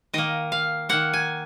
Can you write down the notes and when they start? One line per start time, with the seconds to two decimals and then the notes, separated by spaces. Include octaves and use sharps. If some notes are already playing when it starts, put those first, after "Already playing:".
0.13 D#3 A#3 D#5
0.52 F5
0.89 D#3 A#3 F#5
1.13 G#5